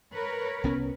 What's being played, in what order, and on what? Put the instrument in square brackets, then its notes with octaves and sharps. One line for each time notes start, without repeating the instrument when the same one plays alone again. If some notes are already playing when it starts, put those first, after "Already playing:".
[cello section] A#4 B4 C#5
[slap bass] C2 B3 C#4